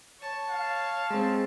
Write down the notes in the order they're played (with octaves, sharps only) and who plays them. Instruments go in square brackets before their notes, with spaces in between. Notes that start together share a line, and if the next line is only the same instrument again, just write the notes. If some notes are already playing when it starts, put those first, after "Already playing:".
[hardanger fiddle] C#5 A5
[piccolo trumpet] F5
[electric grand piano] G#3 C4